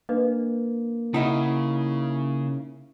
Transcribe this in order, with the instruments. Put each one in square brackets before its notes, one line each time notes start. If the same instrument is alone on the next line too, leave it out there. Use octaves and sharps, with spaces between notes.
[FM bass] A#3 [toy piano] D4 B4 D#5
[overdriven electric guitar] C#3 [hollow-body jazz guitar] D#4 E4 D#5 [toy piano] F#5